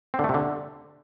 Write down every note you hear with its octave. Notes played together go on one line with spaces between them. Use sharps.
C4
D3
A3
C3
D3